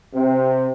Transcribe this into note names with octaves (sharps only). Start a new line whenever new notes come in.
C3